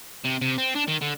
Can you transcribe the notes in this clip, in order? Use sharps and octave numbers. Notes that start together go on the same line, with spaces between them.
C3
C3
C4
D4
D#3
D3